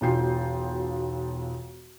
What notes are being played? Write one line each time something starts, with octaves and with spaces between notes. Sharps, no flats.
E1 B1 F4 G5 G6 C7